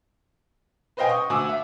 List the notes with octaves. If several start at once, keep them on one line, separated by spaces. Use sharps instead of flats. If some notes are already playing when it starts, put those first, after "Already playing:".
B4 C5 D#5 F5 G5 G#5
C#6 D#6
D2 G#5 D6 E6
E5